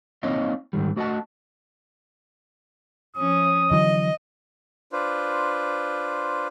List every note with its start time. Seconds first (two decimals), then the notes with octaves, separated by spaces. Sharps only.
0.23 A#3 C4 D#4 C#5 D#5 F5
0.73 G#2 D#3 G3
0.96 A3 F#4 D#5 F5 F#5 A5
3.17 F3 C#4 D#6
3.71 D3 E3 F#3 D#5
4.92 D4 F4 B4 C5